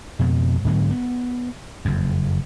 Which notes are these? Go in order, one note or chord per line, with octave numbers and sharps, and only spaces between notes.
F2 B2
G#2 D3 F#3 B3
B3
F#1 F2